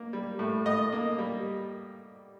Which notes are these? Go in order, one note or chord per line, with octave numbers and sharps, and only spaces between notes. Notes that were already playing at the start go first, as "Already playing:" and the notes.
Already playing: A#3
G3
A2
A2 D#5
A#3
G3